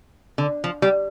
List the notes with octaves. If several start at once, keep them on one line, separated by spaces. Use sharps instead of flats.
D3
F3
G3